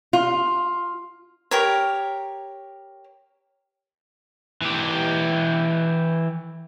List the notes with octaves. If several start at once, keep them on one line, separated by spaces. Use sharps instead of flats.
F4
G4 A#4 C#5
E3 G4